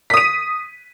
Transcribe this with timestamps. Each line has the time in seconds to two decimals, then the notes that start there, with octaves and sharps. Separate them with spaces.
0.10 B6
0.14 D#6
0.17 D#7